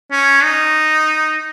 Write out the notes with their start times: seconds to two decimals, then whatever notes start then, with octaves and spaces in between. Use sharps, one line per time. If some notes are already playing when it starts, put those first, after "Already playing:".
0.12 C#4
0.44 D#4